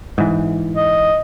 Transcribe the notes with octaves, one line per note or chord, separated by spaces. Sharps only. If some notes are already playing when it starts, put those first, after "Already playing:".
G#2 E3
D#5